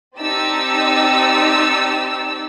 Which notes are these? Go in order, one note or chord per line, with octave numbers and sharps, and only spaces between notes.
C4 D#4 G4 D5 A5 E6